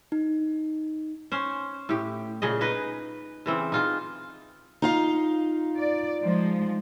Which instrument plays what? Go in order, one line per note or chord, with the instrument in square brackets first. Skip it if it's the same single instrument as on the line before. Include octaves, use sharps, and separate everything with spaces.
[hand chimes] D#4
[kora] C#4 C5
A2 G4
A#2 C#3 G#4 D#5
D#4 G#4 B4 D#5
C#3 E3 C4
D#4 F4 G#4
[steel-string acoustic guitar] D#4 F4 F5
[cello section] D5
F3 G#3